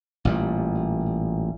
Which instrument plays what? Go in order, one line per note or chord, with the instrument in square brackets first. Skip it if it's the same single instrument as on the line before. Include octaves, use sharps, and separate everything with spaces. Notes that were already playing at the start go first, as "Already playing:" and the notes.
[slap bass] A1 A#2 G3